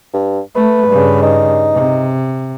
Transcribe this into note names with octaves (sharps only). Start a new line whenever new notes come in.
G2
A3 B4
G2 C#3
D#4
C3